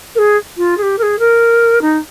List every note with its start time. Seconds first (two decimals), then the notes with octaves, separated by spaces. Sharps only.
0.15 A#4
0.18 G#4
0.57 F4
0.77 G#4
0.82 G4
0.98 A#4
1.02 G#4
1.19 A#4
1.81 D#4